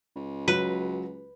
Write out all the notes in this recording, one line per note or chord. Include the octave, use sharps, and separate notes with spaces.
C#2
F#3 B4